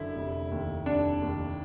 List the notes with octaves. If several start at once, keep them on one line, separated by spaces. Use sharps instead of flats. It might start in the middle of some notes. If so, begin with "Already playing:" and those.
Already playing: F#2 D3 E4
F1
D#2
F1 D4
D#2